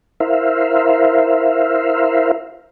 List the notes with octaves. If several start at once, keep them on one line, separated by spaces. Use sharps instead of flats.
E4 A#4 C5 E5 F5